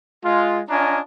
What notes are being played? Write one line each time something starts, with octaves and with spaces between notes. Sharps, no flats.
G#3 F4
C#4 D4 F4 D#5 G#5 A#5